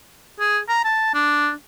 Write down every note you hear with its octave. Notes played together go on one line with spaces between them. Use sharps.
G#4
A#5
A5
D4